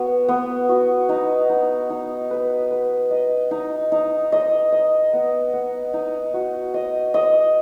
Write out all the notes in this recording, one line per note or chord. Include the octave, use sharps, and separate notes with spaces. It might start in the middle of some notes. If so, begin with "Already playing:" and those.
Already playing: B3 F#4
B3
F#4
D#4
D#4
D#4
B4
B4
D#5
D#4
D#4
D#5
D#5
B3
B3
D#4
F#4
D#5
D#5